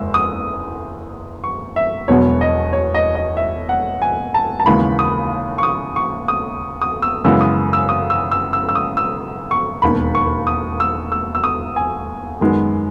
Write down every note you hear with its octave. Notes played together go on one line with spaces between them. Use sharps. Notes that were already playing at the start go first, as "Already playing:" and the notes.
Already playing: F#1 E2 G#3 E6
D#6
C#6
E5
E1 E2 B2 F#3 B3 C#5
D#5
C#5
D#5
D#5
E5
F#5
G#5
A5
A5
D#2 C#3 E3 G#3 B3 B5
D#6
C#6
D#6
C#6
D#6
D#6
E6
F#2 C#3 E3 G#3 B3 E6
D#6
E6
D#6
E6
E6
E6
E6
D#6
E6
C#6
E1 D#2 D#3 B5
C#6
D#6
E6
E6
E6
D#6
G#5
F#2 D#3 G#3 B3